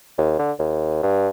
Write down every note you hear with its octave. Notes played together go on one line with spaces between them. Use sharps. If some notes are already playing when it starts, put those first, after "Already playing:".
D#2
D3
D#2
G2